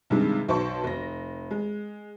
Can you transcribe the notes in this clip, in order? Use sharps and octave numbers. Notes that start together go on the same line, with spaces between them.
G2 C3 D#3 G#3
B1 C5 A5 C#6
F1 A#6
G#3